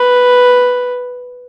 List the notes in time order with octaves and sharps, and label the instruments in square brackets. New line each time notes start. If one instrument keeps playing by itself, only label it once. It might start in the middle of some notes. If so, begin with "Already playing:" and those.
Already playing: [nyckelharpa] B4